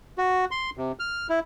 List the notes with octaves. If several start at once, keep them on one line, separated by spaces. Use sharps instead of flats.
F#4
C6
C3
F6
E4